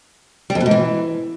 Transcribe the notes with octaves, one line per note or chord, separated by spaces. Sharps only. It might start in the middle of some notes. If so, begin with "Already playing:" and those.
G3
F2
B2
G#2
E3